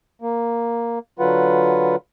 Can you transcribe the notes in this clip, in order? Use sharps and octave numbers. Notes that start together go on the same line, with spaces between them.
A#3
D3 F#3 F4 B4 F#5